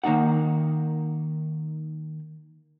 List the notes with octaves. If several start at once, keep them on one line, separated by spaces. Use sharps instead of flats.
D#3 A#3 D#4 F#5